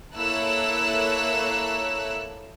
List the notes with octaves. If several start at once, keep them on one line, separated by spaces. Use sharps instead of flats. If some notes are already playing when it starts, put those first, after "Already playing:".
A#3 E4 A4 C#5 E6 F#6